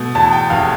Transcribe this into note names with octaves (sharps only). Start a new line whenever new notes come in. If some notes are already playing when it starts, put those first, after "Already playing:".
Already playing: B2 A3
E2 A5
G5
F1 F5